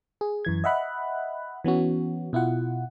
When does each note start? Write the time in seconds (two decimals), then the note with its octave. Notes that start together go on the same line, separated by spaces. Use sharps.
0.21 G#4
0.45 F#2 E3 G#6
0.64 D#5 E5 F#5 B5 F#6
1.64 E3 B3 C#4 F#4
2.33 B2 E4 F4 F#5